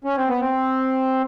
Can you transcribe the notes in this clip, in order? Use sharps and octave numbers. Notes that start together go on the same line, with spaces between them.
C#4
C4
B3
C4